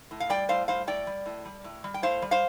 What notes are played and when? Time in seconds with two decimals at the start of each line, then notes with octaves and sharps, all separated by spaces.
0.11 A2
0.20 F5
0.30 G3 D5 G5
0.49 A2 C5 F5
0.68 G3 C5 F5
0.87 A2 D5 G5
1.07 G3
1.26 A2
1.45 G3
1.64 A2
1.84 G3
1.94 G5
2.02 A2 C5 F5
2.22 G3
2.31 C5 F5